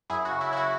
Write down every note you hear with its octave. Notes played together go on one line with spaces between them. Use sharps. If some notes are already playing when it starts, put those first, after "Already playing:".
F#2 E4 G#4
F#4
C#3
E4
C#3 E4
F#4